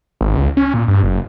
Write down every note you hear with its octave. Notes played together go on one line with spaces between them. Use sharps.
G#1
C#2
C#4
A#2
G2
F#1